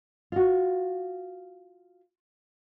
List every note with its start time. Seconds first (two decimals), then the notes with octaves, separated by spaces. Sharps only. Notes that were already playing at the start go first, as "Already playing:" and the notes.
0.32 F4 F#4